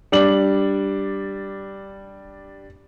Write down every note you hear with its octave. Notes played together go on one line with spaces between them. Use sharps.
G3 D4 F#7